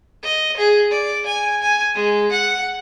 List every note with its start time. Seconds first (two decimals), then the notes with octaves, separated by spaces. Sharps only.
0.24 D#5
0.57 G#4
0.91 D5
1.27 G#5
1.62 G#5
1.96 G#3
2.31 F#5